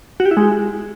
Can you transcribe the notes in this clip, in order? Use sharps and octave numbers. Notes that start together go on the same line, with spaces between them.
F#4
G4
E4
G#3